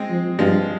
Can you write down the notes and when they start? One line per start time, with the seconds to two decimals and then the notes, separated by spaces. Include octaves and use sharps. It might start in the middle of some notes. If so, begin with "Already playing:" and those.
Already playing: G#3 C4
0.10 F3
0.39 G2 F3 G#3